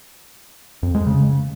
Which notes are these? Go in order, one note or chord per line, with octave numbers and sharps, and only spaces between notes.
F2
G#3
C#3